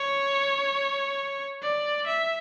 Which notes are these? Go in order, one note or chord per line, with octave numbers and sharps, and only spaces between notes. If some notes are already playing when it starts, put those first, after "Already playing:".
Already playing: C#5
D5
E5